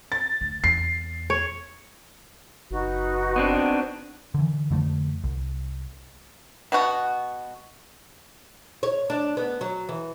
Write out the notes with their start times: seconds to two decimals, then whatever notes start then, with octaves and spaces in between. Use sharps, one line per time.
0.12 A6
0.41 D2
0.64 E2 C7
1.30 C#5
2.71 F#1 D#4 F#4 B4
3.36 B3 C4 D4
4.34 D3 E3
4.71 F2 D3 F3 A3
5.24 C2
6.72 B2 B3 F#4 F#5
8.83 C#5
9.10 D4
9.37 B3
9.61 F#3
9.89 E3